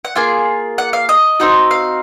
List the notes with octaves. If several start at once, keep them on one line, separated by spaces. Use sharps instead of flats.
F#5
A#3 F4 G#4 G#5
F#5
F5
D#5
C4 D#4 F#4
F5